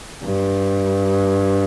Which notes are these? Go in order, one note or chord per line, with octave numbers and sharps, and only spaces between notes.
G2